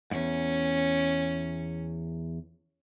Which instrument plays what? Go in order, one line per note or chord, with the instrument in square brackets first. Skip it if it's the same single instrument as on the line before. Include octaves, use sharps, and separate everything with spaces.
[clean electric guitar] E2 G#2 [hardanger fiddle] C#4